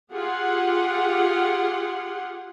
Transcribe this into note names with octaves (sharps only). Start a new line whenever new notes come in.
F4 G4 G#4 F#5